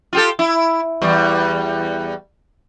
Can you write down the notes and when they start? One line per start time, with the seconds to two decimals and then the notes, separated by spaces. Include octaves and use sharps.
0.13 F4 G4 A4
0.39 E4
1.02 E2 G3